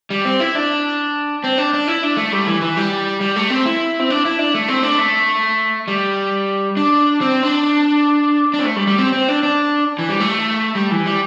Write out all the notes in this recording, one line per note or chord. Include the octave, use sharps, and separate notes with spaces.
G3
C4
E4
D4
C4
D4
D4
E4
D4
A3
G3
E3
E3
G3
G3
A3
C4
E4
C4
D4
E4
D4
A3
C4
D4
A3
G3
D4
C4
D4
D4
C4
A3
G3
G3
C4
C4
D4
D4
E3
G3
A3
G3
E3
G3